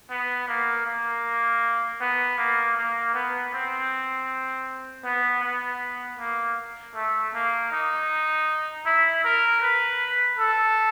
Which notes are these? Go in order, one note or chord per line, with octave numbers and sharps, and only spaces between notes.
B3
A#3
A#3
B3
A#3
A#3
B3
C4
B3
B3
A#3
A3
A#3
D#4
E4
A#4
B4
A4